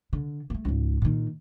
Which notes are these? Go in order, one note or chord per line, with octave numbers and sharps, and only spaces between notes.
D3
A3 A#3
C#2 G#2
A#2 D#3